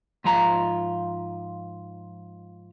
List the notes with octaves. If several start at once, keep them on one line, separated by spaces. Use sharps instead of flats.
G#2 F3 F4 A#5